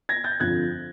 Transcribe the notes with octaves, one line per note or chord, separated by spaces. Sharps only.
G#6 A#6
G6 A6
F2 D3 F3 F#6 G#6